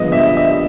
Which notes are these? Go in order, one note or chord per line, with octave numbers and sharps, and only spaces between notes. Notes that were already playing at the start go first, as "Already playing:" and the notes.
Already playing: G2 D3 F3 G#3 B3 D#5
E5
D#5
E5